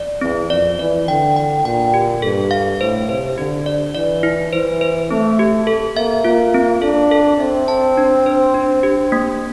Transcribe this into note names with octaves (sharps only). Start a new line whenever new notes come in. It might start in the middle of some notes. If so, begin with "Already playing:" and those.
Already playing: D5
E2 C4
F2 D5
E3 D5
D3 G5
G5
A#2 G5
G4
G2 A4
F5
A2 C5
C3 C5
D3 G4
D5
E3 D5
E4
E3 C5
C5
A3 C4
G4
A4
A#3 E5
A#3 F4
C4
D4 A4
A4
C4 E5
A5
D4
C5
D4
G4
A#3